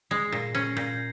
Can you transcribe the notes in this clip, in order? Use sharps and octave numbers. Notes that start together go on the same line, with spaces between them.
G#3 C7
A#2 A#6
C#4 G#6
A#2 G6